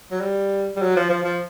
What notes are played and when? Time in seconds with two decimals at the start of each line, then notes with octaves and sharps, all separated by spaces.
0.11 F#3
0.21 G3
0.76 G3
0.82 F#3
0.96 F3
1.09 F3
1.24 F3